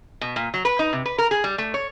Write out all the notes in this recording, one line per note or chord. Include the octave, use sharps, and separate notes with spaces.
B2
A#2
F#3
B4
D#4
C3
B4
A#4
G#4
G3
A3
C#5